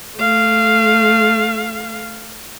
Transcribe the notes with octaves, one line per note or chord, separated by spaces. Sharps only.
A3 F5